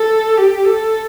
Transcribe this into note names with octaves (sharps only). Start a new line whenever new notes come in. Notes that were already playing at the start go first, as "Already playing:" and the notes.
Already playing: A4
G4
A4